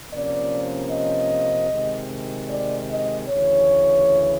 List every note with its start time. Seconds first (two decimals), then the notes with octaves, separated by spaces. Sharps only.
0.13 C3 F3 A#3 C#4 D5
0.92 D#5
1.71 C3 D#3 G#3
2.50 D5
2.89 D#5
3.29 D2 C#3 E3 C#5